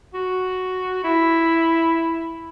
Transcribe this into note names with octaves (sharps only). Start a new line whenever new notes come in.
F#4
E4